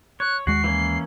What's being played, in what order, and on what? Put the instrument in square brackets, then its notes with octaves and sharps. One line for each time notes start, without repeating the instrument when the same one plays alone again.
[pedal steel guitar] C#5 [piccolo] F#6
[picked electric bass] D#2 G#3 [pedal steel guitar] F#4 [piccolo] C7
[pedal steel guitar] E3 A#3 C#4